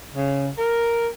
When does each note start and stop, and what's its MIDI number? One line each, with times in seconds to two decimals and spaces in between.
0.15 0.48 49
0.58 1.07 70